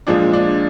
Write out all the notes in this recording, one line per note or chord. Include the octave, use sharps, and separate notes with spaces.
A#2 F3 G#3 D4
D4